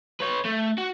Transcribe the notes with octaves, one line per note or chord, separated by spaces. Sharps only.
B4 C#5
A3
F#4